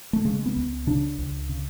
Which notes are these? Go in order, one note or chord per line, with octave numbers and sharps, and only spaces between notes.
A3
C#3 G#3
B3
C#2
C#3 D4
C#2
C#3